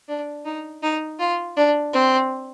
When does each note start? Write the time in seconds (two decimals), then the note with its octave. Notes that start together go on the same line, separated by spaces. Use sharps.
0.08 D4
0.45 D#4
0.83 D#4
1.19 F4
1.57 D4
1.93 C4